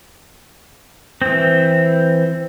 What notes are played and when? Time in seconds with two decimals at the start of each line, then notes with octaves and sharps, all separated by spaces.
1.22 E3 C4